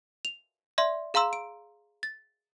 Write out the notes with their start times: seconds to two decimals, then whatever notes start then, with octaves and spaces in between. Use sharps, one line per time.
0.25 F7
0.78 D5 E5 C6
1.14 G#4 F5 A#5 C6 E6 E7
1.33 D7
2.03 A6